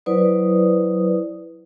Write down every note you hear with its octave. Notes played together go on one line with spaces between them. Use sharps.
F#3 E4 B4 C5 D5 D#6